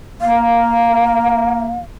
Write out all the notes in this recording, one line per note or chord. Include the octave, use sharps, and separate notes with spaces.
A#3 F5